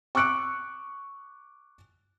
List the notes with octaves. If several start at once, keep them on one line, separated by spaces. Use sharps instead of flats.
C#6 D6 E6 F#6 C#7 D7